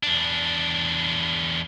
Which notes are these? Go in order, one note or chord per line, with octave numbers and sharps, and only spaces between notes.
E2 D4